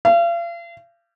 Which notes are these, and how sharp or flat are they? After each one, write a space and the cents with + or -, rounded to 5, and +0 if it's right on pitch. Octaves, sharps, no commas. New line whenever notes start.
F5 -40